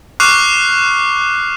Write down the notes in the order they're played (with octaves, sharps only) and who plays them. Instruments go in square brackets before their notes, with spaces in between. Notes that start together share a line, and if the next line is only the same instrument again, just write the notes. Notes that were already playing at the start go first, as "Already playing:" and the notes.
[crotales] C#6 D6 F6 F#6 C7 F7